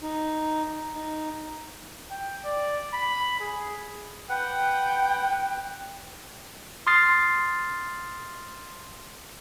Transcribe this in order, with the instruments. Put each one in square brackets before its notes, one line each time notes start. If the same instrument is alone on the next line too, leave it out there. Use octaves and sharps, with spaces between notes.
[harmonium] D#4
D#4
[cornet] G5
D5
B5
G#4
[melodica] B4 F#5 [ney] G5
[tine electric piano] C6 D#6 F6 A6 C7